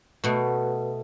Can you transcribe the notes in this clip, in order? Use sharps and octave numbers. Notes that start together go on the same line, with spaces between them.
B2 A3